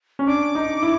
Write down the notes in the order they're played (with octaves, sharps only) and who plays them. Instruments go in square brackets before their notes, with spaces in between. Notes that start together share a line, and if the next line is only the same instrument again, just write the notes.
[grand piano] C#4
[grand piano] D4 [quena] D6
[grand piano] D#4
E4